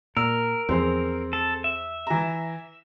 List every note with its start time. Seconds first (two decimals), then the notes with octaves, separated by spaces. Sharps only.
0.17 A#2 A#4 E6
0.69 E2 F3 C4 G#4 C5
1.33 A4
1.64 E5
2.07 E3 A#5